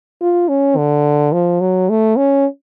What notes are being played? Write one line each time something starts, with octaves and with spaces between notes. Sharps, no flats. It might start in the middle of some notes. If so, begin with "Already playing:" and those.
F4
C#4
D3
F3
F#3
A3
C#4